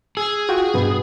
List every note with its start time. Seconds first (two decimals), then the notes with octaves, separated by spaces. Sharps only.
0.17 G#4 E6
0.49 F4 F#4 G5
0.74 G2 B2 B3